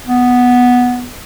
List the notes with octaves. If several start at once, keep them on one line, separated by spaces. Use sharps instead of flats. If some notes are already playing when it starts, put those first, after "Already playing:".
B3